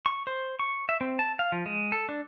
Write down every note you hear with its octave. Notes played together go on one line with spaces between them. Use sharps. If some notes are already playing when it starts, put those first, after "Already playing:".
C#6
C5
C#6
E5
C4
A5
F5
F3
G#3
A4
D4